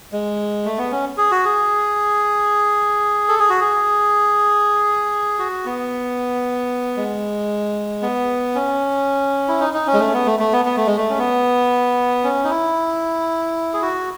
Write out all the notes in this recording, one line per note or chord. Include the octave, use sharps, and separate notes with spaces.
G#3
A3
B3
C#4
G#4
F#4
G#4
A4
G#4
F#4
G#4
F#4
B3
G#3
B3
C#4
E4
D#4
D#4
C#4
G#3
A3
C#4
B3
A3
A3
B3
B3
A3
G#3
A3
C#4
B3
C#4
D#4
E4
G#4
F#4